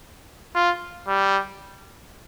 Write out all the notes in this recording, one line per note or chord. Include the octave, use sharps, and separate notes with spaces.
F4
G3